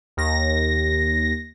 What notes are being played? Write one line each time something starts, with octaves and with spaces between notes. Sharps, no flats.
D#2 A#6